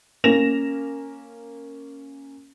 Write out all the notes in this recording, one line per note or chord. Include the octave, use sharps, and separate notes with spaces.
A#3 C#4 A#6 E7 F7